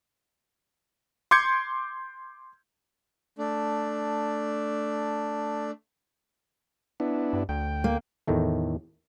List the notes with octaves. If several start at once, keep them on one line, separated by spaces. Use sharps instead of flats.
C6 D6 G6 G#6 C#7
A3 D4
B3 D4 E4
G2
D2 G5
A#3
E2 A2 D#3 A3